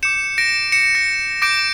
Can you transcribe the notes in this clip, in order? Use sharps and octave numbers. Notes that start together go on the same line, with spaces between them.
D6 G6 C#7 E7
A#6 D7
C#7 E7
A#6
D6 G6 A#6 D7